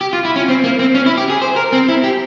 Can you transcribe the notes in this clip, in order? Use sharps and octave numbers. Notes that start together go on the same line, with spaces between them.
G4
F4
E4
C#4
C4
A#3
C4
C#4
E4
G4
G#4
C5
A#4
C4
E4
G4